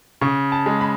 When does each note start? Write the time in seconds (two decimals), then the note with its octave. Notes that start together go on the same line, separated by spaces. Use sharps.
0.21 C#3 C#6
0.52 A5
0.66 G#3
0.81 B5